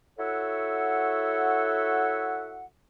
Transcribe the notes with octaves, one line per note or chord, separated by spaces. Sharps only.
E4 F#4 A4 C#5 E5 F#5